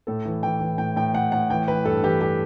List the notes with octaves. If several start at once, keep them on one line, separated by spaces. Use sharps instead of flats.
A2 A4
E3
E3 G5
E3
A2 G5
A2 G5
A2 F#5
A2 F#5
E3 G5
E3 B4
G2 A4
E3 G4
G4